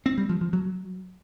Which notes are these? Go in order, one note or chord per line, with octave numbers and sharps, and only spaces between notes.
C4
G3
F3
F3
F#3